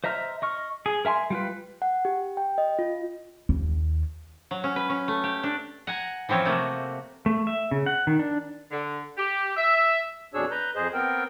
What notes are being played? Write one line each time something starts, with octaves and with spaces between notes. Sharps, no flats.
C5 D#5 E5 A#5 F6
D#5 C#6 F6
G#4
A#4 E5 G#5 C6
G3 F4 B4
F#5
G4
G5
D#5
F4
D#2
F#3
C#4
B4
C#4
A3
G4
D4
F#5 G#5 A#5
E3 F3 C4 C#4 C#5
C3 A3 A#3 F#4
A3
E5
C#3
F#5
D#3
D4
D3
G4
E5
F2 B2 D4 G#4 C#5 E6
B4 A#5 G6
F2 G#4 C5 D#5
B3 C4 A#4 G5